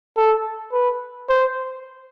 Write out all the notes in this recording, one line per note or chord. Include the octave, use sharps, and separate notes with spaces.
A4
B4
C5